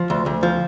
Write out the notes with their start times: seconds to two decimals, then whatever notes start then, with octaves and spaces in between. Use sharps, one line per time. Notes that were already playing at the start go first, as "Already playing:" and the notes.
Already playing: F3
0.10 D2
0.26 D2
0.43 F3